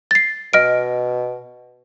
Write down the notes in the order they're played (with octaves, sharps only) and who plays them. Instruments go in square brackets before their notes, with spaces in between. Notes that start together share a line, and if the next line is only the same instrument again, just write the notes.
[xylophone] A6 C7
[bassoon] B2 [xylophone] D#5 F6 D7